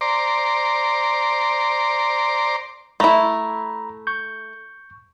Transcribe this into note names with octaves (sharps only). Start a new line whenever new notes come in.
C5 D5 A#5 C6 D6
A3 E4 A#5 B5
C#6 G6